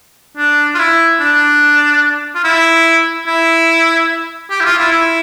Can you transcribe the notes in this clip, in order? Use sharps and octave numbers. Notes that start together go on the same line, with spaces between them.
D4
F4
E4
D4
F4
E4
E4
G4
E4
F4
E4
E4